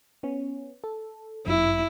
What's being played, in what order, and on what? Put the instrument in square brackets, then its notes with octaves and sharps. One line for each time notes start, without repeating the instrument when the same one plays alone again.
[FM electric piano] B3 C#4
A4
[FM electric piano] G1 F#2 [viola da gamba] E4